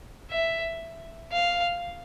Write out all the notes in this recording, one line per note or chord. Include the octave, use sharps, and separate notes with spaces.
E5
F5